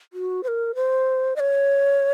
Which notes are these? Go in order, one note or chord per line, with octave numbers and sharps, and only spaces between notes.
F#4
C5
A#4
C5
D#5
C#5